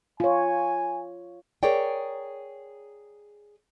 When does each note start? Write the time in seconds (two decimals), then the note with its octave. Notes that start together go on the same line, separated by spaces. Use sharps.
0.20 F4 C#5 G#5
1.63 G#4 A#4 C#5 D5 G5